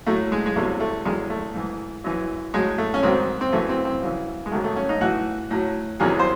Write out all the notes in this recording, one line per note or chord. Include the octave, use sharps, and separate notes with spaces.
A2 F#3 A3
G#3
G#3
E2 C3 F#3 A3
A3
E2 D#3 F#3 G#3
A3
G#2 E3
F#2 E3
A2 F#3 G#3
A3
C#4
G#2 D#3 F#3 C4
C4
F#2 E3 A3
C4
C4
F#2 C#3 E3
G#3
G#2 D#3 F#3 A3
A3
C#4
D#4
A2 E3 F#4
A2 F#3
E2 C3 D#3 F#3 G#4
C5